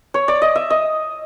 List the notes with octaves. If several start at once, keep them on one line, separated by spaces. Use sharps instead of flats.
C#5
D5
D#5
E5
D#5